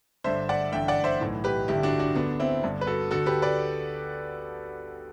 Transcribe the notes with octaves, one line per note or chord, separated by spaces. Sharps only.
G1 G2 D3 C5 E5
D5 F#5
A1 G2 D3 E5 G5
D5 F#5
C5 E5
B1 A2 E3
G4 B4
G1 G2 D3 E4 G4
D4 F#4
D4 F#4
D2 D3 B3 D4
C4 E4
G1 G2 D3
B4
F#4 A4
D2 D3 F#4 A4
G4 B4
B4 D5